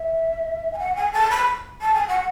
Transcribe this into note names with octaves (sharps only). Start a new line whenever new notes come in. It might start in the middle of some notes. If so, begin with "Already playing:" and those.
Already playing: E5
G#5
F#5
G#5
A5
B5
A5
G#5
F#5